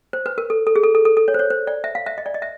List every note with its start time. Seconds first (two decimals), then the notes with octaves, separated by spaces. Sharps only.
0.13 C5
0.26 B4
0.38 A#4
0.50 A4
0.67 A4
0.76 G#4
0.84 A4
0.95 A4
1.05 A4
1.17 A4
1.28 C#5
1.34 C5
1.39 C#5
1.50 C5
1.67 D5
1.84 E5
1.95 F5
2.06 E5
2.18 D#5
2.26 D5
2.34 D#5
2.42 E5